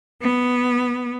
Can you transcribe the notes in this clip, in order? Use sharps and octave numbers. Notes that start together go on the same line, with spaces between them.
B3